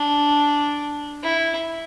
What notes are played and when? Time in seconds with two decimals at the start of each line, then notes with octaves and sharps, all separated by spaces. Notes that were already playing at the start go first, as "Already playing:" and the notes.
Already playing: D4
1.23 E4